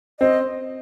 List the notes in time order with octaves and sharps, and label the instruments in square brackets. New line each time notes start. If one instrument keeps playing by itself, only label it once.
[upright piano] C4 [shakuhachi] D#5